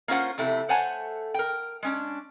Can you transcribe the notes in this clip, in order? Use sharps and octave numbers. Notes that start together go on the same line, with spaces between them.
A#3 C#4 F4 C5 F#5
F2 C3 A3 E4
A3 C5 C#5 F#5 G#5 A5
A#4 G5
G#3 C#4 D4